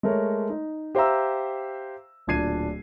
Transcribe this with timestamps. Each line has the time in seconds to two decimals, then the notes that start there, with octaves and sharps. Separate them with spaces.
0.03 G#3 A3 A#4 C#5
0.50 D#4
0.95 G4 C5 E5 F5 A#5 E6
2.27 D1 A#2 D4 G#6 C7 D#7